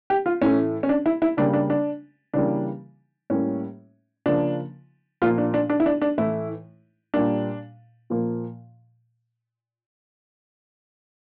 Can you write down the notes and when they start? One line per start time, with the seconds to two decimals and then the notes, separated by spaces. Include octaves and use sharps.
0.10 G4
0.26 F4
0.41 A2 E3 A3 C#4
0.83 C#4
0.89 D4
1.06 E4
1.22 E4
1.37 C#3 G3 A#3 D4
1.54 D4
1.70 D4
2.34 C#3 E3 G3 A#3 D4
3.30 A2 G3 A#3 C#4
4.26 C#3 F3 A#3 D4
5.22 A#2 F3 A#3 F4
5.38 D4
5.54 D4
5.70 D4
5.80 E4
5.86 D4
6.02 D4
6.18 A2 E3 A3 E4
7.14 A#2 G3 A#3 D4
8.10 A#2 F3 A#3